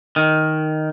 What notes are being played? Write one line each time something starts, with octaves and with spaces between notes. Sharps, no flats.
D#3